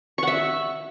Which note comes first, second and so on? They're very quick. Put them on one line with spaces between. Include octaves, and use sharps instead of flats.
C#6 F#5 E5